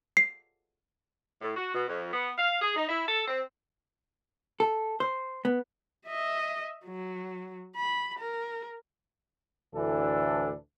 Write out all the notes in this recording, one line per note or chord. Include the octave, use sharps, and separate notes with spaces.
C7
A2
F#4
B2
F2
B3
F5
G#4
D#4
E4
A4
C4
A4
C5
B3
D#5 E5
F#3
B5
A#4
D2 A2 E3 D4 A4